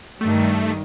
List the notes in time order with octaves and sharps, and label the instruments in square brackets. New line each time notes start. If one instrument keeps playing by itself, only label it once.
[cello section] G2 D#3 G3 [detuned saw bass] A3